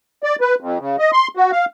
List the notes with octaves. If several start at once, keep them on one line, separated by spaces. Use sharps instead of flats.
D5
B4
F2
C#3
D#5
C6
F#4
F5